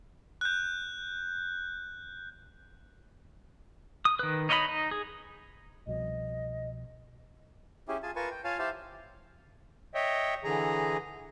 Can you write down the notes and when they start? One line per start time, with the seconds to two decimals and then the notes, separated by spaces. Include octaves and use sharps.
0.41 F#6 G6
4.05 D#6
4.19 D#3 B4
4.49 D#4 C#5 D#5 E5 B5
4.68 D#4
4.91 G#4
5.87 C2 B2 F3 D#5
7.88 C#4 E4 G4 G#4
8.03 F4 G#4 G#5 A5
8.16 F4 A#4 B4 G#5 A5 C#6
8.31 G5
8.44 F4 C#5 F5 G#5 A5
8.59 E4 G4 C5 E5 F5 A5
9.95 C#5 D#5 E5 G5
10.44 D3 E3 G#4 A#5